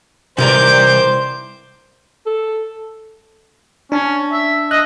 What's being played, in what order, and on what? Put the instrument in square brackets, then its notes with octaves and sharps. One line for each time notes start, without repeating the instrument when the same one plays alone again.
[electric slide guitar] C3 A#4 [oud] D#3 E3 G3 [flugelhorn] C5 [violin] D6 G6
[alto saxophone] A4
[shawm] C#4 [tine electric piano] D4 A5
[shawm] E5
[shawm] D#5 [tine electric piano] F#6